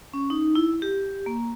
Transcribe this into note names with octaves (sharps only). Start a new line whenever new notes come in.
C#4
D#4
E4
G4
A#3